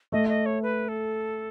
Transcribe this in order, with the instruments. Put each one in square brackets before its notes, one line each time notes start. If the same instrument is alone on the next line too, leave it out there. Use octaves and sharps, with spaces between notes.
[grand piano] A3 [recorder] D#5
[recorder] D#5
C#5
B4
A4